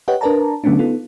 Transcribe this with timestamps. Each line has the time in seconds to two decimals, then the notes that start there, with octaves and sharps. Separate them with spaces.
0.08 G4 B4 C#5 D#5 F#5 G5
0.21 D4 A#4 B4 D5 A5 A#5
0.64 D3 F#3 A3 B3 C#4 D4
0.79 B3 D#4 F4 A4